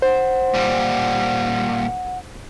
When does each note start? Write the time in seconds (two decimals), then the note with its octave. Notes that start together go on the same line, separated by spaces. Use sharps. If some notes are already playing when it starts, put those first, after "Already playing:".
0.02 C5 F#5
0.54 A#2 G3